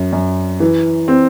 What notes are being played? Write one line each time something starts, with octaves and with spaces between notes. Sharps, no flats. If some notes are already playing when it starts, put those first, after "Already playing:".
Already playing: F#2
F#2
E3
C4